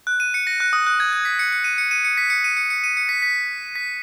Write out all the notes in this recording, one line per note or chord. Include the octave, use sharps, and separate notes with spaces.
F#6
D#7
C#7
A#6
F#6
D#6
F#6
G#6
G#6
B6
C#7
C#7
D#7
C#7
D#7
C#7
B6
C#7
D#7
C#7
C#7
D#7
C#7
B6
B6
B6